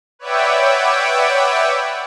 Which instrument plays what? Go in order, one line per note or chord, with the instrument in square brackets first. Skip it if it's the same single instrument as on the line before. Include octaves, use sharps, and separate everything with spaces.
[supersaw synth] B4 C#5 D5 E5 F#5 G5